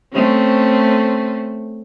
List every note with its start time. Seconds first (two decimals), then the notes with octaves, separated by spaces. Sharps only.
0.13 A3 C4 C#4